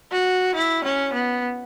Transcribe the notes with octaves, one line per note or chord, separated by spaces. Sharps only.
F#4
E4
C#4
B3